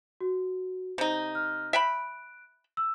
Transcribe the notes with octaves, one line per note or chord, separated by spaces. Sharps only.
F#4
C3 D#4
F6
E5 G5 B5 F#6 D7
E6